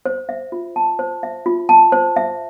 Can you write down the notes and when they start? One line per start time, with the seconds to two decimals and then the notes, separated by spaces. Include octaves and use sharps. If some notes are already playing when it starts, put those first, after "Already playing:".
0.06 C5
0.29 E5
0.52 F4
0.76 A5
0.99 C5
1.23 E5
1.46 F4
1.69 A5
1.92 C5
2.16 E5